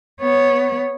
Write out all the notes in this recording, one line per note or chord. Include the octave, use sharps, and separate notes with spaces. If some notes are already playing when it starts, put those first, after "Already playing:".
B3 C#5